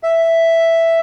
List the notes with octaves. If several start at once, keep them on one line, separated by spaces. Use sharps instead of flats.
E5